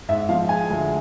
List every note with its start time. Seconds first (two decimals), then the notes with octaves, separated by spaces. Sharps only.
0.09 G#2 E5
0.29 F3 F5
0.49 G#3 G#5
0.70 D2